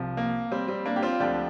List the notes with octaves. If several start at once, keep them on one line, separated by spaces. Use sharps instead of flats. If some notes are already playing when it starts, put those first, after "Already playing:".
Already playing: C2 C3 F3
A#3
G3 C4
G3 C4
A#3 D4
G4
C4 F4
D2 D3 F3 D4 G4